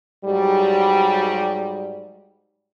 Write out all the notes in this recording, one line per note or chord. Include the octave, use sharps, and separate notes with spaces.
G#2 F#3 G3